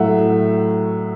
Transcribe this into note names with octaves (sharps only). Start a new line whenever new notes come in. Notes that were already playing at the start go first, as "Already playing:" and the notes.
Already playing: A2 F#3 A3 E5 F#5